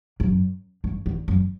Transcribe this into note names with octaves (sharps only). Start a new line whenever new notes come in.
F#2
G2
E2
F#2